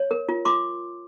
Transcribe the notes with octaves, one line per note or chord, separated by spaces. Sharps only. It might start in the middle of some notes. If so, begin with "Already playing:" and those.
Already playing: C#5
A#4
F4
F4 C6 D6